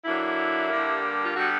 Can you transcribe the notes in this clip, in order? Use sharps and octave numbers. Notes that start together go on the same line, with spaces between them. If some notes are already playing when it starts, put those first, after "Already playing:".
D3 F#3 A#3 D4 E4
G2 D3 G3 A#3
F4
D3 G3 B3 F#4